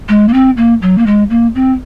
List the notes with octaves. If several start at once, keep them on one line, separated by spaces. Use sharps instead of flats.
G#3
A#3
C4
A#3
F#3
A#3
G#3
A#3
C4